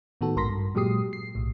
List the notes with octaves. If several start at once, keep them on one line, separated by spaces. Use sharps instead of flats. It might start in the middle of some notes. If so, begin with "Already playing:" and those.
A2 D#3 B3 F#4 A4
A#1 G#2 A#4 C6 A#6 B6
G2
A#2 F#3 G#3 G4 D#6 C7
C7
B1 A2